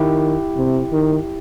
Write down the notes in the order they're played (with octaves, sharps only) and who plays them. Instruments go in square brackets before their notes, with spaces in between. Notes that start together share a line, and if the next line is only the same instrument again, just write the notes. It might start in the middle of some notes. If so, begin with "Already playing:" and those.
Already playing: [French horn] D#3 [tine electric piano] E4 G4
[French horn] C3
D#3